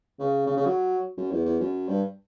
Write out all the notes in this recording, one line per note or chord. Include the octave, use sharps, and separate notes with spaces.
C#3
C#3
C#3
F#3
F#2
E2
E2
F#2
G2